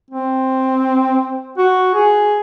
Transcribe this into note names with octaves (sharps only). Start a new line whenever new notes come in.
C4
F#4
G#4